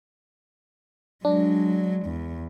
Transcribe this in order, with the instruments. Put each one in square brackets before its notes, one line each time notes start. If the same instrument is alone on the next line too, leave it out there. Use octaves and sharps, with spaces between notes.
[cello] F#3 G#3 [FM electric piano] D4
[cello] E2